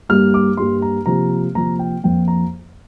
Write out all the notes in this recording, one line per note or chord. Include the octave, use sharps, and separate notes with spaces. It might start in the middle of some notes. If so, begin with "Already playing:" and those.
G2 G3 A#3 F6
D6
G2 G3 A#3 C6
A#5
C3 F3 A#3 A#5
C3 F3 A#3 A#5
G5
F2 F3 A#3 G5
A#5